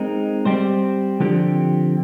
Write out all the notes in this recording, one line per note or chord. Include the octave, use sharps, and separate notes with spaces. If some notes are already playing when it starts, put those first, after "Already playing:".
Already playing: G#3 C4 D#4 A#4
G3 C4 G4 C5
D3 F3 C4 G4